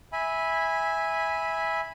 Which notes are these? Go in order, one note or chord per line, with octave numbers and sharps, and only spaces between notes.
E5 G#5 B5